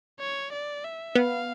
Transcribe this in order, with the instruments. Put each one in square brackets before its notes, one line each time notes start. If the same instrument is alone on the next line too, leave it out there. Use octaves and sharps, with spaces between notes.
[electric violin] C#5
D5
E5
[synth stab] B3 [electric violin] F5